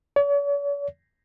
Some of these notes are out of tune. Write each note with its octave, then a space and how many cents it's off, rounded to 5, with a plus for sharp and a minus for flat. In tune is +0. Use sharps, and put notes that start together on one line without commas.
C#5 +45